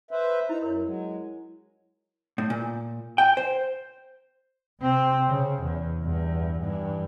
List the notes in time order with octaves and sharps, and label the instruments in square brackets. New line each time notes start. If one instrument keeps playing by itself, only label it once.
[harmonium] B4 C5 E5
[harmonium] D#4 A#5 [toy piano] E4
[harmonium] F#2 [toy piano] A#4 C#5
[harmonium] F#3 G#3
[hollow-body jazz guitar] A2
A#2
G5
C5
[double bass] C3 C4
C#3
E2
E2 G2
G2 E3